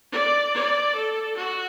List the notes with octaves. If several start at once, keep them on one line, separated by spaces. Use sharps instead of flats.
D5
D5
A4
F#4